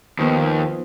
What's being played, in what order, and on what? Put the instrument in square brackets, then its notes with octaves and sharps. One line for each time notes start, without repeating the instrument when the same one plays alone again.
[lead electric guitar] D#2 [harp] F3 B3 D#4